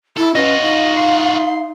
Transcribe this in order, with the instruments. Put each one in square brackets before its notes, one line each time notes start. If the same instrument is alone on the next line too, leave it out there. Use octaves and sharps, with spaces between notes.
[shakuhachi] E4 [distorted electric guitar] A4
[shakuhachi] C#4 [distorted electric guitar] F4 F#4 [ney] B4 [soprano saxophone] D#5
[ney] D#4 [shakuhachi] F5
[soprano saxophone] C6